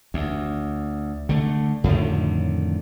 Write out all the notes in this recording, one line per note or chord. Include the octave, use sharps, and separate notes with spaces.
D2
D3 A3
F2 A2 D3 D#3